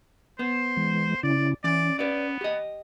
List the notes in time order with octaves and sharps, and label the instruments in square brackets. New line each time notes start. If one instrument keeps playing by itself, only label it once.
[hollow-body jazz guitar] B3 [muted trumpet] C5
[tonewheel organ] E3 G#3
[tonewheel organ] C#3 C#4 E4 [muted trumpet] D5
[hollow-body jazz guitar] E3 [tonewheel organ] C#4 [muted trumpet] D5
[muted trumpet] B3 [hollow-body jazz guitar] B4 D5
[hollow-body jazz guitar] G4 D#5